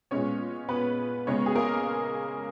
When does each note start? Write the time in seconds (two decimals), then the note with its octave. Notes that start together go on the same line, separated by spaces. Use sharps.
0.11 A#2 G#3 B3 C#4 C#5
0.69 B3 B4
1.27 C#3 G#3 B3 C#4 C#5
1.46 G#4
1.55 A#3 A#4